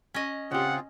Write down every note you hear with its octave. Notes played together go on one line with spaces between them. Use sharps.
C#4 D#5
C#3 C4 F4 G4 G#4 F#5